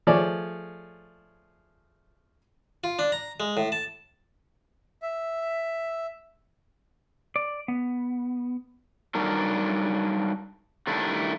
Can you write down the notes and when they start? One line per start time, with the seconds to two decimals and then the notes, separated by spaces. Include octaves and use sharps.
0.07 F3 A3 G#4 C#5 D5
2.84 F4
2.99 D4
3.12 A#5
3.40 G#3
3.57 A2
3.72 A5
5.02 E5
7.36 D5
7.68 B3
9.15 F#3 G3 D4 D#4 A#4
10.87 D#3 G3 A3 D4 E4